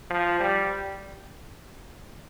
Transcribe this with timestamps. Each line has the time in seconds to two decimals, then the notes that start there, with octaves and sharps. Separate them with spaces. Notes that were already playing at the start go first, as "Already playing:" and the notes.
0.10 F3
0.40 G3